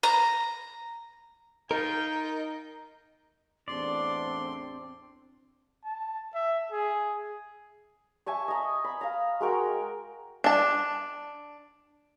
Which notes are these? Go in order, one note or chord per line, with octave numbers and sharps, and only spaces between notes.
A#5
D#4 F4 A#4 G5
A1 E2 C4 D4 D5 C6
A5
E5
G#4
E5 G#5 A5 C#6
D#5 A#5
B5
F5 A#5
G#3 F#4 A#4 G5
D4 A5